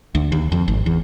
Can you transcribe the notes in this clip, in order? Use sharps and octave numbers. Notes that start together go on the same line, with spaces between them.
D2
D#2
F2
G#1
E2